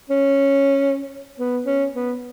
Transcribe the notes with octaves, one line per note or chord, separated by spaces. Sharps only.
C#4
B3
C#4
B3